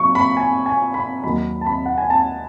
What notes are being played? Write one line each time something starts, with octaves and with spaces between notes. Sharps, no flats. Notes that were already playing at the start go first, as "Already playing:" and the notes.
Already playing: F#3 C#6
B5
G#5
G#5
B5
D#2 D#3 F#3 B5
A5
B5
F#5
G#5
A5